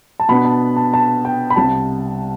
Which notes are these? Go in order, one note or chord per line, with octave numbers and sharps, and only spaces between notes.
A5
B2 B3 D4 B5
A5
A5
A5
G5
B5
C2 C3 G3 A5